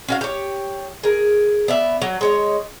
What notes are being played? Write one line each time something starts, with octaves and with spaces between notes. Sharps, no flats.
C#4 F#4 F5
G4 C#5
G#4 A#4
B3 D5 E5
F#3
G#3 C#5 D#5